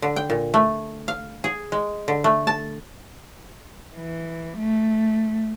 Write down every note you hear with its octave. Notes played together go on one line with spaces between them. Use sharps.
D3
G5
A#2
A3
F5
G#4
G#3
D3
A3
A5
E3
A3